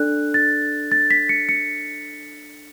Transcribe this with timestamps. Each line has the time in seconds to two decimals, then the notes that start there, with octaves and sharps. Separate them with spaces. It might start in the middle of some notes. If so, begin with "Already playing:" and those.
Already playing: D4 A4 D5 F#6
0.34 A6
0.92 A6
1.11 B6
1.29 C#7
1.49 C#7